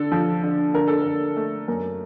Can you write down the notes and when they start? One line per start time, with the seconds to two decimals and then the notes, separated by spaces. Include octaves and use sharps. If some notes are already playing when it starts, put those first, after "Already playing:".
Already playing: D3 A4
0.12 F3
0.43 D3
0.74 D3 A#4
0.88 A4
1.02 D3 A#4
1.36 A3
1.68 F#2 A#4